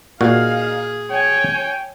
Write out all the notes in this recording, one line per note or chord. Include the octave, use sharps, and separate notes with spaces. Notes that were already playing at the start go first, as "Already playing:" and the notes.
A#2 D#4 F#4 G#4 F5
C#5 G5 G#5